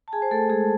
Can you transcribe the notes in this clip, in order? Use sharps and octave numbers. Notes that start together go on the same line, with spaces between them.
A5
G#4 G#5
C5
A3 A4
G#3 G#4